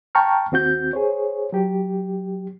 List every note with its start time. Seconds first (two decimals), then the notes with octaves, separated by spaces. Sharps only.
0.15 G5 A5 A#5 C#6 F6
0.52 D#2 C4 F#4 G6
0.93 G#4 C5 C#5
1.52 F#3 G4